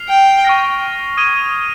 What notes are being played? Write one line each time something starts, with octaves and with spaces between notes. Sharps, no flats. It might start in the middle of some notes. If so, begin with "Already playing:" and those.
Already playing: F6 C7 F7
G5
C#6 F6 A#6
D#6 G#6 D#7 G7